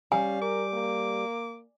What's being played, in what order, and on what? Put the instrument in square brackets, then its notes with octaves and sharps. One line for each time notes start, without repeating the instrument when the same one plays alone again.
[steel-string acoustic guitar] G3 [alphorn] C#4 [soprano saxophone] F5 [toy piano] G#5
[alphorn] A#4 [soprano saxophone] D6
[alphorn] A#3